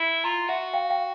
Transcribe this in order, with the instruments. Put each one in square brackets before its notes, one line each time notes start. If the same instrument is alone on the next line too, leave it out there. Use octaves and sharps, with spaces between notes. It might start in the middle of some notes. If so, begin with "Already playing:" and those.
Already playing: [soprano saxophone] E4
[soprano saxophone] F4 [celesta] A#5 C6
[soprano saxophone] F#4 [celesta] E5 F#5
[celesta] F5 G5
F5 G5